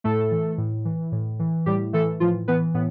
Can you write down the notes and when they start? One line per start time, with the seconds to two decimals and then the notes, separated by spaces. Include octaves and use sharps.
0.04 A2 A3 A4
0.31 E3
0.58 A2
0.85 E3
1.12 A2
1.39 E3
1.66 A2 G3 G4
1.93 E3 A3 A4
2.20 A2 F3 F4
2.48 E3 B3 B4
2.74 A2 B3